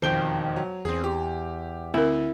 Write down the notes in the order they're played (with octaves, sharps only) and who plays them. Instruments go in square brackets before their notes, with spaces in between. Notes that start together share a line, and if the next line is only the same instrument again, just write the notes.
[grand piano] E1 F2 G7 [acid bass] D#3 [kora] C5 G5
[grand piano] F#3
[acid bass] E2 [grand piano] C4 G#4
[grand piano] G4
[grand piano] D2 [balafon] C4 A#4 [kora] E4